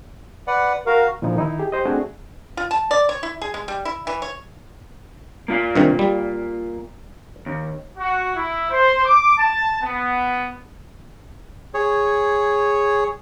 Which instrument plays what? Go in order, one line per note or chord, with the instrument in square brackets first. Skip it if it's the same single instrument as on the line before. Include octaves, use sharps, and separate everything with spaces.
[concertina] B4 D5 F#5
[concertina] F#4 F5 [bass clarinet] A#4
[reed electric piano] A#2 D3 F3 D#4 E4
D#3 D#4 E4
G4 G#4
G4 C5 D#5
A3 C4 D4 F#4 G#4
[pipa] F4
A5
D5
C#5
E4
G#4
G#3
G3
E4
E3
C#5
[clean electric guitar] A#3 F4 F5
[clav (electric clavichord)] G2 C3 D#3
G3
[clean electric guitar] D#2
[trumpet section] F#4
E4
C5
D6
A5
B3
[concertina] G#4 C#5